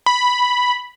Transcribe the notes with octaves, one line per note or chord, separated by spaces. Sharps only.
B5